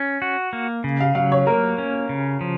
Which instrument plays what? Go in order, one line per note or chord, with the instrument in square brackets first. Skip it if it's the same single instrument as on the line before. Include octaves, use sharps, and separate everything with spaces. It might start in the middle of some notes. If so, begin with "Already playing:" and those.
Already playing: [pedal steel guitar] C#4
F#4
A#3
C#3
[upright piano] F5
[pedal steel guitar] F#3 [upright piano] F5
[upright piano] C#5
[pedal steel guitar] A#3 [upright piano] A#4
[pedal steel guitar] C#4
C#3
F3